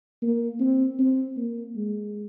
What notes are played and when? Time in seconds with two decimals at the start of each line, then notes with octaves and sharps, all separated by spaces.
0.22 A#3
0.60 C4
0.99 C4
1.37 A#3
1.76 G#3